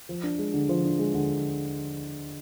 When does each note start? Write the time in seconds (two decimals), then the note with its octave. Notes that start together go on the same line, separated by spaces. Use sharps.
0.09 F3
0.23 D4
0.39 G#3
0.54 D3
0.69 F3
0.85 D4
0.99 G#3
1.14 D3